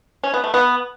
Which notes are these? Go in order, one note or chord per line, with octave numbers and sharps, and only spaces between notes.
C#4
B3
A3
B3